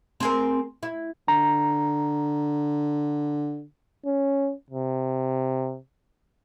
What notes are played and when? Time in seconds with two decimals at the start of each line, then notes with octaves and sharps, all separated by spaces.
0.20 C4 G#4 A#4
0.83 E4
1.28 D3 A#5
4.06 C#4
4.70 C3